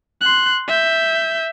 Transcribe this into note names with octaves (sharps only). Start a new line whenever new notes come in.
C6 F#6
E5 G6